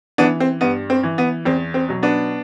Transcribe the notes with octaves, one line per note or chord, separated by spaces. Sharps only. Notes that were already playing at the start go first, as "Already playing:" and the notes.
E3 B3 D4
C4
G2 B3
C4
E3
B3
E2 C4
C4
B2 F#3
B3 D4